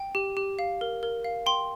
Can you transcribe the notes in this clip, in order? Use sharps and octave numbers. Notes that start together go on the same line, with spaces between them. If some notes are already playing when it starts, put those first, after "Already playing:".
Already playing: G5
G4
G4
F5
A#4
A#4
F5
G5 C6